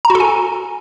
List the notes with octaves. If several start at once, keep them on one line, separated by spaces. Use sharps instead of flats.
A#5
F#4
A4
G#5